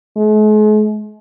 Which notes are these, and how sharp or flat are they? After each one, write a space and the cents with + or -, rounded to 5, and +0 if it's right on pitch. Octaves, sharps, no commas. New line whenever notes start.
G#3 +45